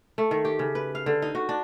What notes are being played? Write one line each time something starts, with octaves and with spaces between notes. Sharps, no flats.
A3
D#3
G4
C#3
B4
F5
D3
D#4
F#4
D4